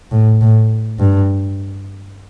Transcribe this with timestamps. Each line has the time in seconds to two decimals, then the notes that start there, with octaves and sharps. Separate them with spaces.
0.11 A2
0.41 A2
0.99 G2